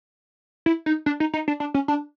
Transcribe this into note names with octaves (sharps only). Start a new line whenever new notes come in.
E4
D#4
D4
D#4
D#4
D4
D4
C#4
D4